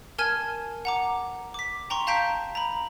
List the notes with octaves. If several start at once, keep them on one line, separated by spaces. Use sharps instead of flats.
A#4 G#5 A5 F6 G#6 D#7
F#5 A#5 D6
D6 B6
G5 A#5 C6 C#6
F5 A5 A#5 G6 B6 D7
A#5 B5